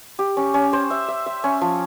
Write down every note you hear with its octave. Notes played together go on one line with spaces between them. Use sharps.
G4
C#4
C#4
C5
E5
E5
E5
C#4
F3